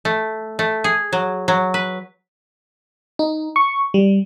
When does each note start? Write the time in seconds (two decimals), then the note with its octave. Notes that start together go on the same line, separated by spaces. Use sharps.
0.05 A3
0.59 A3
0.84 G#4
1.13 F#3
1.48 F#3
1.74 B4
3.19 D#4
3.56 C#6
3.94 G3